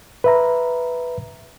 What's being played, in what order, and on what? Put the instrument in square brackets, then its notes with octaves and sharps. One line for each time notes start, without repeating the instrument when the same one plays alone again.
[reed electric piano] B4 E5 A#5